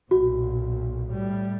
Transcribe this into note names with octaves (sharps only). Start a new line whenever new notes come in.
B1 A#2 F#4
A2 G3